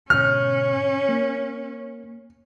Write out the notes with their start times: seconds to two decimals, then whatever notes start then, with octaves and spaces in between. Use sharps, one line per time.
0.10 G#2 B2 D3 C#4 F6
1.09 A#3